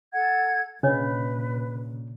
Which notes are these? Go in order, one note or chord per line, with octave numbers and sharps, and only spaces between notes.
A4 F#5 G#6
A#2 C#3 D4 B4 C#5 D#5